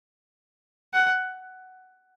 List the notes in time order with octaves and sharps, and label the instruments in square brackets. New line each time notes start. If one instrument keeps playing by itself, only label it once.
[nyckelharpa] F#5